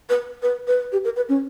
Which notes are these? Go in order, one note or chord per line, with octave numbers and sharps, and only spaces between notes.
B4
B4
B4
G4
A#4
B4
C#4